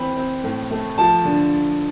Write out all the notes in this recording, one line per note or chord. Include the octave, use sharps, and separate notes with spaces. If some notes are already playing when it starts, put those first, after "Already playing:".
Already playing: E3 C4 B5
C4
A2
A3
F3 A5
D3